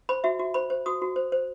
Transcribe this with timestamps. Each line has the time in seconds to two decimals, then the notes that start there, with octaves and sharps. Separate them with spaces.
0.09 C5 B5
0.24 F#4 E5
0.39 F#4
0.54 C5 B5
0.70 C5
0.86 F#4 D#6
1.02 F#4
1.16 C5
1.32 C5